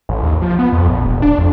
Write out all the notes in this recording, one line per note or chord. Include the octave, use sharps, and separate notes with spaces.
A1
D#2
F3
B3
F2
A#1
E1
D4
F2